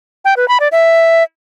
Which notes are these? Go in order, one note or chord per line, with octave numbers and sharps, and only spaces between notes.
G5
B4
B5
D5
E5